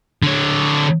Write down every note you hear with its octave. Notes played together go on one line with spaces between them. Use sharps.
D3 C#5